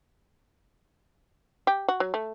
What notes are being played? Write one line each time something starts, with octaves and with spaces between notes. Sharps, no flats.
G4
F#4
F#3
A3